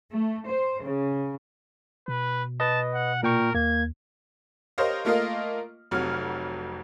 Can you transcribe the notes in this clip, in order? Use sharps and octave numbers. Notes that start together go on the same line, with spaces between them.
A3
C5
C#3
B2 B4
B4 D#5 A5
F#5
A#2 A#4 G5 C#6
D#2 A#3 G#6
G4 A#4 C5 C#5 D#5 F5
A3 A#3 F4 A#4 D#5 F5
F1 F2 F#3 F6